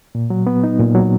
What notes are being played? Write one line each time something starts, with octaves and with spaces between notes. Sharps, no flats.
A#2
F#3
B3
D#4
A#2
F#3